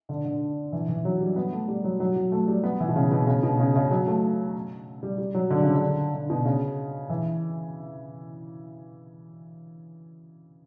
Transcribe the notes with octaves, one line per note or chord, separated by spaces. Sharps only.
D3
D3
E3
E3
F#3
G3
B3
A3
G3
F#3
F#3
F#3
A3
G3
B3
E3
B2
C#3
B2
C#3
B2
C#3
C#3
F#3
A3
G3
G3
F#3
D3
C#3
D3
D3
B2
C#3
E3